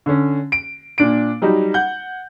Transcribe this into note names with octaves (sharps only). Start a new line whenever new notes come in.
D3 C#4
D7
A#2 D4 D7
F#3 G3 D#4
F#5 G6